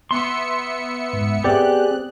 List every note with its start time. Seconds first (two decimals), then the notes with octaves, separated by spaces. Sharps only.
0.11 B3 E5 C6 C#7
1.13 G#2
1.44 B3 C4 G4 G#4 D5 F#6